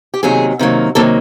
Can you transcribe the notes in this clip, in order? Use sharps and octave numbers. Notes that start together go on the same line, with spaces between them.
G4
C3 D#3 F#3 A#3 G#4
C3 D#3 F#3 A#3
C3 D#3 F#3 A#3 A4